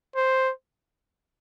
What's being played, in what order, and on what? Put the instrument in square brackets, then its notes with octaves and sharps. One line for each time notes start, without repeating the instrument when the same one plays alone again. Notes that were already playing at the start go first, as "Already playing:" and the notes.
[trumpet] C5